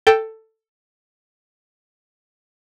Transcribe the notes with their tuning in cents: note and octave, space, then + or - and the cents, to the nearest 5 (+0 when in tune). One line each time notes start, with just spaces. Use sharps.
A4 +10 G5 +0